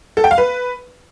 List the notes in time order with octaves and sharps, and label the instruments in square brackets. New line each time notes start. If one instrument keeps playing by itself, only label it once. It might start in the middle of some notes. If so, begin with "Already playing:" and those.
[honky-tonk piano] A4
G5
F5
B4